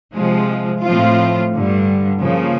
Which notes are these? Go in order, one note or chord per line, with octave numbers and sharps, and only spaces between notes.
C3 F3 G#3
A2 F3 A3 C4 F4
G2 D3 G3
C#3 F3 A#3